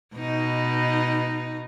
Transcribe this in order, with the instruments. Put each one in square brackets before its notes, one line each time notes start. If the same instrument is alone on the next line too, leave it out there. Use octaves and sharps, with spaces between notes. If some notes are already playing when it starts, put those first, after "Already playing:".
[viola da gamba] B2 D#4